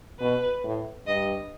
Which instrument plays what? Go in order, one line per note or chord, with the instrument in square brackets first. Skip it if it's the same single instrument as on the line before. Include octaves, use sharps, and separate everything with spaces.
[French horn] B2 [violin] B4
[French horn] A2
[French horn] G2 [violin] D#5